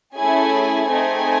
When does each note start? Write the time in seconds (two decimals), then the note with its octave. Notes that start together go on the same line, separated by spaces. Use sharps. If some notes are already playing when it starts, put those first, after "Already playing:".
0.17 A3 C#4 E4 G#4 G#5
0.89 A3 C4 D#4 G#4 G#5